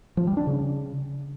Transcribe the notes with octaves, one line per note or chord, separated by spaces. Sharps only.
F3
G3
D4
C#3